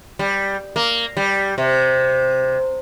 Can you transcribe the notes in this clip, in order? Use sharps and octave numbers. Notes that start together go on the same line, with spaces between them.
G3
A#3
G3
C3